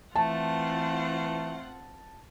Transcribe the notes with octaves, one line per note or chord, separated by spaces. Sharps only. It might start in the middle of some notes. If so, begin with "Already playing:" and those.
E3 A3 C4 F4 F#5 A5